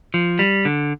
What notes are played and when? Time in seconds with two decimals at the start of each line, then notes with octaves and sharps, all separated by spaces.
0.14 F3
0.39 G3
0.65 D3